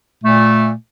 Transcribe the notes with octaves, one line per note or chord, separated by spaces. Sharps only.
A#2 A3